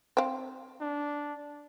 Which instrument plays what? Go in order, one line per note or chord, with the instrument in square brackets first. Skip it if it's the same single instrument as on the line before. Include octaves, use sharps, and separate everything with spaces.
[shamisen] C4 F5
[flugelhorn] D4